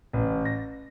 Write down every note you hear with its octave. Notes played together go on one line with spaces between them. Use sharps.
A1
A#6